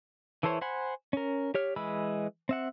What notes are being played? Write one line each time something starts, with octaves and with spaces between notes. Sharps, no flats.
E3 E4 A4 C5 C#5
C5 F#5 G#5 B5
C#4 A#4
G4 C#5 F6
E3 G#3 B5 E6
C4 E5 F#5